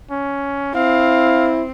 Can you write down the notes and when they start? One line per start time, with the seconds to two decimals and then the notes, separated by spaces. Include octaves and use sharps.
0.11 C#4
0.75 C4 E4 F5